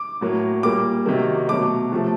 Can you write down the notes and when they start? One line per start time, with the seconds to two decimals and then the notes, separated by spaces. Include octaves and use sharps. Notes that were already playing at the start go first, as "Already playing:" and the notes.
Already playing: D6
0.21 A2 F#3 A#3
0.63 A#2 G3 A#3 D6
1.06 C3 D#3 F#3 A#3
1.49 B2 F#3 A3 D6
1.92 C3 F3 A3